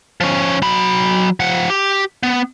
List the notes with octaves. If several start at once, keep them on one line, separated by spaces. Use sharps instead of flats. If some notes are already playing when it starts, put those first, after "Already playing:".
F3 C#4
F#3 B5
F3 F#5
G4
B3